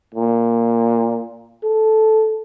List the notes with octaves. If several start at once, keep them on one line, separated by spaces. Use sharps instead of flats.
A#2
A4